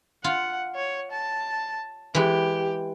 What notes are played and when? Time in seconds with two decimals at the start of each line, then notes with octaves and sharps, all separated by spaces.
0.24 F4 F#5
0.76 C#5
1.12 A5
2.15 E3 G#3 G4